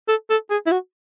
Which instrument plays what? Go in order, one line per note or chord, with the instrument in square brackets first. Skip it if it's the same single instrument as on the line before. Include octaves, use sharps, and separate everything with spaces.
[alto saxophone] A4
A4
G#4
E4
F#4